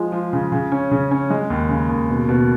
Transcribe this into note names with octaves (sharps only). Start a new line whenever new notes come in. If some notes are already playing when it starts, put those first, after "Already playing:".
Already playing: F3 G#3
F3
C#3
C#3
C#4
C#3
C#4
G#3
D#2
C#3
D#2
B2
B2